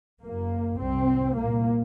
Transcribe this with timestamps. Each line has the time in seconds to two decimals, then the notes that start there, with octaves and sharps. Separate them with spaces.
0.22 F#1 F#2 A#3
0.78 C2 C3 C4
1.36 C2 A#2 A#3